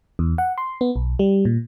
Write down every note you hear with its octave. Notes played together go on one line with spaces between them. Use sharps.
E2
F#5
C6
B3
B1
G3
A#2